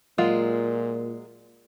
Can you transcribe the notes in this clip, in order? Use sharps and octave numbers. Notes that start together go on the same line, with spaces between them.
A#2 F#3 G#3 F4